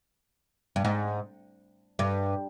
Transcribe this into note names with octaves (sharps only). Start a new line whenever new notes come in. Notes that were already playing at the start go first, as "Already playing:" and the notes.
G2
G#2
G2